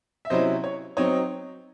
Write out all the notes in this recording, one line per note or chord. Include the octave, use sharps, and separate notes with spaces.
E5
C3 F#3 C#4 E4 C5 D#5
C#5
F#3 C4 D#4 C#5